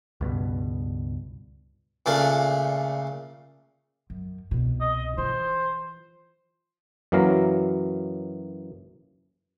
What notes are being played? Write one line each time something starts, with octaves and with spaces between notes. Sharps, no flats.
C#2 G2 B2
A#2 C#3 A3 D4
F#2
C2 B2
D#5
E3 F4 C5
F#2 E3 F#3 A#3 F5 A#5